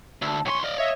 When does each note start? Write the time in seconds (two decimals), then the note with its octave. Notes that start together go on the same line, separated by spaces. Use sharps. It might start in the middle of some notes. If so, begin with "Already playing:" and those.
0.22 D2 A5 E6
0.46 B1 C#5 G#5 C6 C#6
0.64 D5 D#5 F5
0.78 C#5 D#5 E5